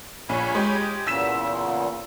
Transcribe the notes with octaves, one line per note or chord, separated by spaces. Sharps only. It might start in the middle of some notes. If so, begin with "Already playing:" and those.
A#1 C#5 G#5 B5
G#3 G4
E2 A#2 C#3 E6 B6 E7